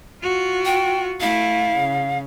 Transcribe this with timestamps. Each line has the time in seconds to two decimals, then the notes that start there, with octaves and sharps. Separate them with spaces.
0.22 F4 F#4
0.65 G5
1.21 A3 E4 F5
1.75 C#3